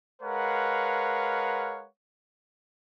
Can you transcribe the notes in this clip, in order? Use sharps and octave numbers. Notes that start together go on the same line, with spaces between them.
G#3 A#4 B4 C#5 F5 F#5